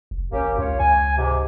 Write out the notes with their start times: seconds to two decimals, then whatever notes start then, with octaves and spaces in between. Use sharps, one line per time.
0.11 F1
0.32 G#1 A#3 C#4 G4
0.58 C#2 F4 C#5
0.80 C#2 G#5
1.18 G#2 C3